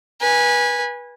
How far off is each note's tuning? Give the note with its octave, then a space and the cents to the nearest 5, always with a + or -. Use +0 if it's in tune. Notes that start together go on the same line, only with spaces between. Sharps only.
B4 -25 G#5 -15